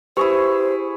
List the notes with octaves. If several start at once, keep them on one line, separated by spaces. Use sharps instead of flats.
E4 G4 G#4 B4 C5 C#6